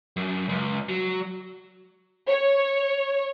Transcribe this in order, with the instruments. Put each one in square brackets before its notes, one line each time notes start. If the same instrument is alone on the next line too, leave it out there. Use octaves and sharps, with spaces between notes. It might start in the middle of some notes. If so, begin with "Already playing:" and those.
[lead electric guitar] F#2
C#2
F#3
[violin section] C#5